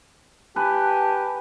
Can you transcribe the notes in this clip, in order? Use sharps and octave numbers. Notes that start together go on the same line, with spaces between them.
G4 B4 G#5 A5